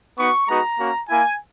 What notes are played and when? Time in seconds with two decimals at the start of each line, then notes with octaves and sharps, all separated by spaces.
0.18 B3 D#4 F#4 C#6
0.48 G#3 B3 D#4 F#4 A#5
0.79 A#3 C#4 F#4
1.09 A#3 E4 G#5